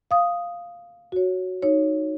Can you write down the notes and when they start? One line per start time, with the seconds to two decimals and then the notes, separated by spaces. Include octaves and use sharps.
0.11 F5 D#6
1.12 F#4 C#5
1.62 D#4 C#5